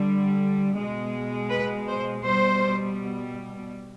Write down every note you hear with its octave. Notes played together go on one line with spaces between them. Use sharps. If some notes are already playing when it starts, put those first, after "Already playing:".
Already playing: D3 G3
B2 G#3
B4
C5
B2 G3 C5